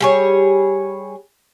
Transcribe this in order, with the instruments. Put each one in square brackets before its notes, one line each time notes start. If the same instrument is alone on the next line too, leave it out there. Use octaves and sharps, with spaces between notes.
[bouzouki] G3 G#4 C#5